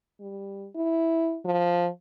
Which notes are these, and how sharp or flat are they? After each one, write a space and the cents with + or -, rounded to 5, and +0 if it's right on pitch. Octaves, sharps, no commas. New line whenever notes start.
G3 +10
E4 -5
F3 +5